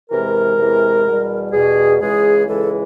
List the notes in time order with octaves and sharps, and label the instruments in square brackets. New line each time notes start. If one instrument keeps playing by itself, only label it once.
[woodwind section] E2 C3 E3 G#3 A#4
E2 C3 E3 G#3
E2 B2 G3
E2 B2 G3 G#4
C#2 C#3 E3 G#3 G#4
C#2 C#3 E3 G#3 A4